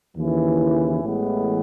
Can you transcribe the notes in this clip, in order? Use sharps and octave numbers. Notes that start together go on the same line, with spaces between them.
D#2 C#3 E3
A1 A2 E3 G#3 B3